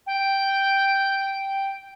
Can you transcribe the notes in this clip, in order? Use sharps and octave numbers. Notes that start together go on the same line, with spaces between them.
G5